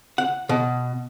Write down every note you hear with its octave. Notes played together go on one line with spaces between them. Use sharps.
F#5
B2